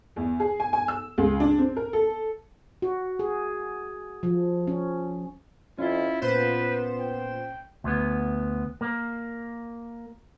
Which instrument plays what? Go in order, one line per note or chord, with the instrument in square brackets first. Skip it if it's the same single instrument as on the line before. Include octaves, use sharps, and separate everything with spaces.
[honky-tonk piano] E2
G#4
G#5
G#5
E6
C#2
D4
C4
A#4
A4
[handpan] F#4
G#4
F3
C#4
[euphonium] F2 [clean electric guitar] C#4 F4 [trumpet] E4
[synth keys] A#2 C5 E7 [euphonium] B3 [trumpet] B4
[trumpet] G5
[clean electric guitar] D2 B3
A#3